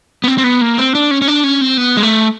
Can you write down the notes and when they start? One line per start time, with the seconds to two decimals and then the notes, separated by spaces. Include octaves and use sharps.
0.24 B3
0.28 C4
0.38 C4
0.44 B3
0.61 A#3
0.78 C4
0.95 D4
1.11 C#4
1.22 C#4
1.28 D4
1.44 C#4
1.61 C4
1.78 B3
1.97 G#3
2.03 A3